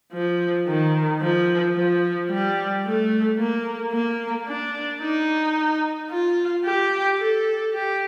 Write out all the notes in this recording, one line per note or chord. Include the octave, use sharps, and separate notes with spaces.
F3
D#3
F3
F3
G3
A3
A#3
A#3
D4
D#4
F4
G4
A4
G4